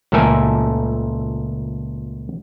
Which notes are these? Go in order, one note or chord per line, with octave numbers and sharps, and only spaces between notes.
C#2 A#2 A3 A4 A#4 G#5